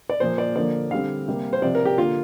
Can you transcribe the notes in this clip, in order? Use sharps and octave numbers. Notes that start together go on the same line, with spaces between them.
D5
A#2 F3 A#3 C5
D5
D3 F3 A#3 D5
D3 G3 C4 F5
C3 G3 A#3
C5
C3 F3 C4 D5
A#4
G4
D3 A#3 F4